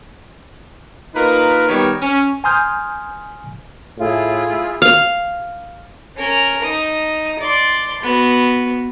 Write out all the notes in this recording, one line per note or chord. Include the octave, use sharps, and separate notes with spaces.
A#3 D#4 F4 A#4 B4
D#3 G3 B3 G4 A#4 C#5
C#4
G#5 A#5 C6 D#6 F6 G6
A2 E4 F4 G#4
F5
C#4 A#4
D#4 D#6
D5 C6
B3 F#4